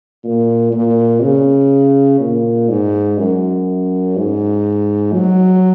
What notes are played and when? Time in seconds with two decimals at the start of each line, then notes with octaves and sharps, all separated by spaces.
0.24 A#2
0.73 A#2
1.22 C#3
2.20 A#2
2.69 G#2
3.18 F#2
4.17 G#2
5.13 F#3